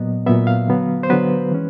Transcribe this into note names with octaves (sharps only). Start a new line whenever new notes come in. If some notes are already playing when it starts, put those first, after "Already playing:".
Already playing: A#2 F#3 B3 D#5
A#2 F#3 B3 E5
F5
D3 F#3 B3
C5
D3 F#3 B3 B4
E3 G#3 C#4